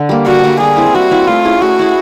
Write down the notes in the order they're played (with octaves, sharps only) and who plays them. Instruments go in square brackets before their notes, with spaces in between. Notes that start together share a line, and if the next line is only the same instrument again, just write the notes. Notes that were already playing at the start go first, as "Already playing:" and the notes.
Already playing: [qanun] D3
G3 A#3
[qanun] D3 [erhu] F#4
[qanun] G3 A#3
[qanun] G3 [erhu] G#4
[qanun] C4 E4
[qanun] G3 [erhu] F#4
[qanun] C4 E4
[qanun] A3 [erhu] F4
[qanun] C#4 E4 G#4
[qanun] A3 [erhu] F#4
[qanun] C#4 E4 G#4